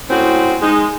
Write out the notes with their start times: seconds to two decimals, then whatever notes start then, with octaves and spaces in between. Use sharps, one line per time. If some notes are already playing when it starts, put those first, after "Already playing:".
0.10 A2 G#3 C4 C#4 F#4
0.62 G#3 D#4